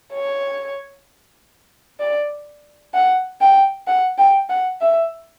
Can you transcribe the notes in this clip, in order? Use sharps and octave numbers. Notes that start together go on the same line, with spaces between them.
C#5
D5
F#5
G5
F#5
G5
F#5
E5